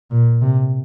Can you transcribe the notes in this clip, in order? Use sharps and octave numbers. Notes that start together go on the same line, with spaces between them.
A#2
C3